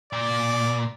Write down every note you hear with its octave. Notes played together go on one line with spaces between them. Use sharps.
A#2 D5